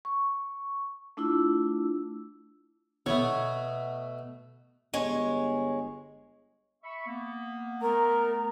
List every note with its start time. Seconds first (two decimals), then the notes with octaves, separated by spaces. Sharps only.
0.05 C#6
1.17 A3 D4 E4 F4 E6
3.06 B2 A3 B3 C#5
4.94 G1 G#3 C#5
6.83 E5 B5 C#6
7.06 A#3 B3
7.82 A3 B3 A#4 A#5